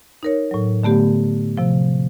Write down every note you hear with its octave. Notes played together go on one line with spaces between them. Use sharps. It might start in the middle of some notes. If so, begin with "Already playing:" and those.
D#4 A#4 C#5
A2 F#3
D3 A3 B3 G4
C3 F3